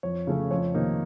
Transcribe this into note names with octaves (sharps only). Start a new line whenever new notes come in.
F2 C#5
C#3 A3 C#4
F2 C#5
C3 D#3 A#3 D#4